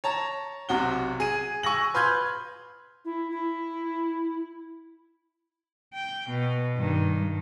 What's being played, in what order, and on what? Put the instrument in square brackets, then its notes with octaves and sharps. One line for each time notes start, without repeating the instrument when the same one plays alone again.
[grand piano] C#5 A5 A#5
B1 C3 F#4 G7
G#4 D#7
G#5 C#6 E6 A#6 F#7
B4 C6 F6 G6 G#6
[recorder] E4
E4
[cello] G5
B2
G2 D#3